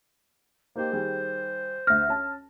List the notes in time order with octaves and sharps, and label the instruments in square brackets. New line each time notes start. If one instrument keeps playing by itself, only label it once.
[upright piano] A#3 D#4 G4 [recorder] C5
[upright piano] D#3 G3 G#4
[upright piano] D2 A#6 [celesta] F6
[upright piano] C#4 A5